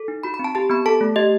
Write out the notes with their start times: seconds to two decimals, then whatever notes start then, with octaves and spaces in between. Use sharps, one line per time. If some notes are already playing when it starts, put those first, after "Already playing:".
Already playing: A4
0.08 D#4
0.23 F#4 B5
0.34 B5
0.39 C4
0.44 A5
0.55 G4 A5
0.70 B3 B5
0.86 A4 A5
1.01 A3
1.16 G4 D#5